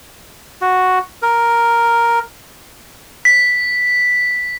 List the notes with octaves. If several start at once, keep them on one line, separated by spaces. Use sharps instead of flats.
F#4
A#4
B6